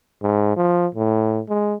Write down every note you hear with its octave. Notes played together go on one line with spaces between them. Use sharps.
G#2
F3
A2
G#3